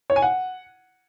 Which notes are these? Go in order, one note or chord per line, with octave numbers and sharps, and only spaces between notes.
C#5
G#5
F#5